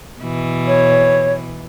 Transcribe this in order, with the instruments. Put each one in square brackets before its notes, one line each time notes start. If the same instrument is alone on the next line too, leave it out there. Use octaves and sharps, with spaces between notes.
[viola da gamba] B2 E3
[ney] C#5